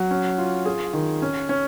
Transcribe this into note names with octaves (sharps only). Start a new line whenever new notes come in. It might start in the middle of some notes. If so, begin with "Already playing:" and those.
Already playing: F#3
C#4
F4
G#4
D#3
C#4
C#4